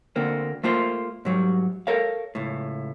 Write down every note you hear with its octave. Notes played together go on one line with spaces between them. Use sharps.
D2 D3 A#3 C4
A3 A#3 F4 C5
G#2 F#3 G3
A4 A#4 C#5 F5
C#2 A2